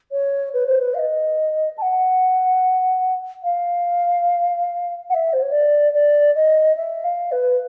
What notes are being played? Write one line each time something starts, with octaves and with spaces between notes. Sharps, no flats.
C#5
B4
C5
B4
F5
D#5
A5
F#5
F5
F#5
E5
C5
C#5
D5
D5
D#5
E5
F5
B4